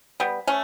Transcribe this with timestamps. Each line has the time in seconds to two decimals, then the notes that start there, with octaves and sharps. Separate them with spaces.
0.20 G3 B3
0.47 A3 C#4